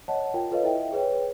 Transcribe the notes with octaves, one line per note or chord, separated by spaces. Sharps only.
C#5 D#5 F#5 A5
F4 A#4 G5
F4 A4 B4 C#5 D#5 F5
E4 D#5 E5 G5
G#4 B4 C#5 G5